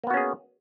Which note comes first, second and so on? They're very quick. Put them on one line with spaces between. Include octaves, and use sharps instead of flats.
A#3 B3 F#4 C#4 G#4